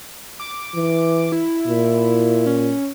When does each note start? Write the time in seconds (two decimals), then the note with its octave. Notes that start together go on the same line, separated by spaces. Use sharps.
0.40 D6
0.75 E3
1.32 E4
1.67 A#2
2.46 C#4